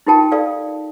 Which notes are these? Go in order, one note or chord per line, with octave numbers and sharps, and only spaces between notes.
D#4 F4 G4 A#4 G5 A5
A4 D5 F5